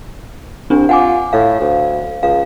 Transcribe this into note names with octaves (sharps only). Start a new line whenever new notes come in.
C2 C4 D4
F4 F#5 G#5 D6
A2 F5
D2
C#2 F5